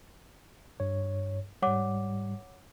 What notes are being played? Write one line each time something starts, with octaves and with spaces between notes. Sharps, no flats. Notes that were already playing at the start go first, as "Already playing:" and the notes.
G2 C#5
G#2 G3 C#5 F#5 D6